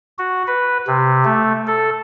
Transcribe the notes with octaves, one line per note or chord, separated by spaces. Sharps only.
F#4
B4
C3
A3
A4